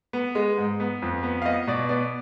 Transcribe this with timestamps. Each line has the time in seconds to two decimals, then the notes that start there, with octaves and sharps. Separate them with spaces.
0.13 B3
0.35 G#3
0.58 G#2
0.80 B3
1.02 F2
1.23 B3
1.42 F5
1.45 B3 D#5
1.67 B2 D5
1.89 B3 D5